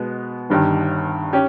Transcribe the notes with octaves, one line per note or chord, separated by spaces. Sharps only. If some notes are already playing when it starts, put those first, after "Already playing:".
Already playing: B2 G#3 B3
G1 G2 D#3
C#4 G4